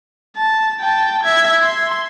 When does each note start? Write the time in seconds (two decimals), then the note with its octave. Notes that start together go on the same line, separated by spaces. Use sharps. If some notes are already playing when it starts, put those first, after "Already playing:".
0.36 A5
0.81 G5 A5
1.23 E5 G#6
1.62 C6